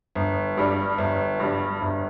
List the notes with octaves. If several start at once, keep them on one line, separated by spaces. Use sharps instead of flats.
G1
G2 G3
G1
G2 G3
G1